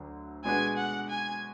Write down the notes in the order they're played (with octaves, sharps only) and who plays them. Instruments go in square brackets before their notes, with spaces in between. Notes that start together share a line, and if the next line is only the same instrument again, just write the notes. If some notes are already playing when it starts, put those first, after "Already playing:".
Already playing: [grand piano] D2 D3 F#3
[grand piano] B2 G#3 D4 F#4 B4 [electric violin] G#5
[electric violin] F#5
G#5